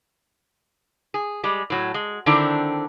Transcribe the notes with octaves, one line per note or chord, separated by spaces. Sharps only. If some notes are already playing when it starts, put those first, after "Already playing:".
G#4
G3 G#3
A2 F#3
G#3
D3 D#3 C4 D4 E4